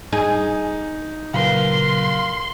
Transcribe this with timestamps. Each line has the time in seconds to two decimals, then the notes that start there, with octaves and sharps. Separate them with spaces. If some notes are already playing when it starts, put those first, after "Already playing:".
0.13 D#4 G#4
1.34 A#2 C#3 F#3 A#4 B4 F5 C6